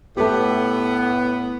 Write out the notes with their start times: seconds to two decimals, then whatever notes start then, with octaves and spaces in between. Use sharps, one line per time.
0.17 A2 A3 B3 G4